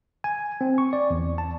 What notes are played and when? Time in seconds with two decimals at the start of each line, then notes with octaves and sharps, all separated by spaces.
0.24 G#5
0.61 C4
0.78 C#6
0.93 D5
1.10 E2
1.38 A5